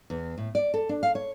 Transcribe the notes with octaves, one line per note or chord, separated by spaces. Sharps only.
E2
A2
D5
A4
D4
F5
C#5